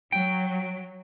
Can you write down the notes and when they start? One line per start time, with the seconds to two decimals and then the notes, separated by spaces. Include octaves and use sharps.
0.12 F#3 G5